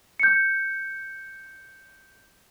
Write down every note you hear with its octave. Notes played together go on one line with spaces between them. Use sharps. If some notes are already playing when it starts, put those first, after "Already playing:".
G6 C#7